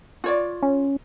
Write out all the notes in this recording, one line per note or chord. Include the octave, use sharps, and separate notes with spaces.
F4 C#5 D5
C#4